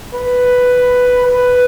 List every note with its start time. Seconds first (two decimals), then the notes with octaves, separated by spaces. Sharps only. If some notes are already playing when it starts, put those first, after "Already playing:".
0.13 B4
1.26 B4